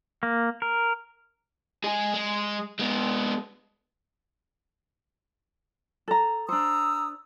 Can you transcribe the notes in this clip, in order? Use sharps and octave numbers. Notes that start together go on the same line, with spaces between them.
A#3
A#4
G#3 G#4
G#3
G#3 B3
A4 A#5
D4 C5 A#5 D#6 E6